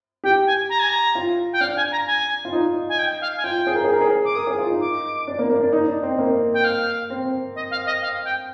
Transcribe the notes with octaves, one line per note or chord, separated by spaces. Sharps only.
G4 G5
G#5
A#5
G#5
A#5
F4
G5
D4 F5
G#5
A#5
G#5
F4
D#4
G#5
G5
F5
G#5
F4 G5
G#4
A#4
G#4
A#4
G#4
D6
A#4 D#6
G#4
F4
D#4
D6
D4
A#3
A#3
D4
D#4
D4
C4
A#3
G5
F5
C4
D#5
F5
D#5
F5
G5